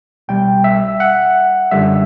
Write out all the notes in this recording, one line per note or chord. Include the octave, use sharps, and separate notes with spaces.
C2 B2 G3 G5
E5
F#5
F#2 D3 G3 E5